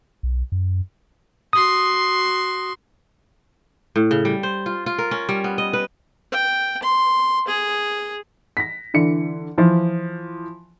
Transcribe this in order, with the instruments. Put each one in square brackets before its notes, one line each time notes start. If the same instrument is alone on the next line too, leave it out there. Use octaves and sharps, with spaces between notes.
[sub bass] B1
F#2
[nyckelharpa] F#4 C6 [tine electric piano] D#6
[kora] A2
C#3
G3
C5
F4
F4
A#4
C#4
G3
B3
D#5
B4
[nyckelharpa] G5
C6
G#4
[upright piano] A#6 B6
D3 E3 C#7
E3 F3